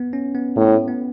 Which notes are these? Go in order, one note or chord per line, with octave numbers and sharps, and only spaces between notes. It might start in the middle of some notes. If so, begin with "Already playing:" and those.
Already playing: B3
C#4
B3
A2
B3